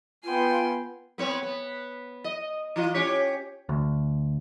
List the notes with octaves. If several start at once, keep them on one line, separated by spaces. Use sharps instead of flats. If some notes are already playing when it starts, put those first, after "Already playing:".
B3 F4 G5 G#5 C6
B3 C4 C#5
B3
D#5
E3 F4 D#5
C#4 G4 C#5
D2